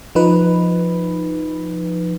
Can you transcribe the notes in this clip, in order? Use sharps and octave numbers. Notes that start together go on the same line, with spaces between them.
F3 D#4 B4